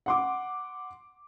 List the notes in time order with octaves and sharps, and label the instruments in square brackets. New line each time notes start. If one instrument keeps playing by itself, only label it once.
[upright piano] F#5 C6 D6